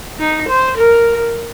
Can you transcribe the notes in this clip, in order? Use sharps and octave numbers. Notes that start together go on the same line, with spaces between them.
D#4
C5
A#4